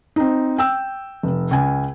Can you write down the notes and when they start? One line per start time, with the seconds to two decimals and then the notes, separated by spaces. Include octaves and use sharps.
0.16 C4 D#4
0.58 G5 E6
1.23 F1
1.51 C#2 G#5